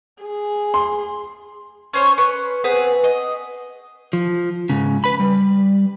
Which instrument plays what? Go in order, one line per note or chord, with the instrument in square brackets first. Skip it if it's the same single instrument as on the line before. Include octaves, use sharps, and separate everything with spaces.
[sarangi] G#4
[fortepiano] C6
[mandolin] C#4 C5 C#5
B4 C#6
B3 C4 G#4 B4
D#5
[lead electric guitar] F3
G#2 C#3
B4 B5
G3